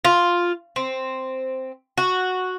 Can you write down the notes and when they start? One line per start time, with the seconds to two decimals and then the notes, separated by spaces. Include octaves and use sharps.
0.05 F4
0.76 C4
1.98 F#4